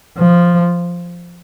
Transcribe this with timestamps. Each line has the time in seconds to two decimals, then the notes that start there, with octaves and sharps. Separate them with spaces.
0.19 F3